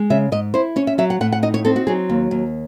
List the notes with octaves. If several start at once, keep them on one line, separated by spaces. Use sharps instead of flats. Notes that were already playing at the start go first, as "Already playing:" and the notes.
Already playing: G#3
C#3 E5
G#2 D#5
E4 C5
C#4 C#5
E5
F#3 E5
F#5
A2 F#5
F#5
D#4 D#5
C#5
C4 A4
F#4
F#3 G#4
D#2
D#2